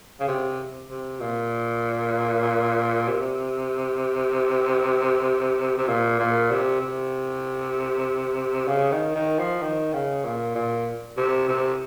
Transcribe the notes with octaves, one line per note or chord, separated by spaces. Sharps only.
C#3
C3
C3
A#2
C3
C3
A#2
A#2
C3
C3
C#3
D#3
D#3
F3
D#3
C#3
A#2
A#2
C3
C3